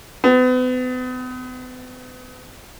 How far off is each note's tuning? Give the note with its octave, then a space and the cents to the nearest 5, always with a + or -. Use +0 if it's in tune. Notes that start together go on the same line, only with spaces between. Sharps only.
B3 +40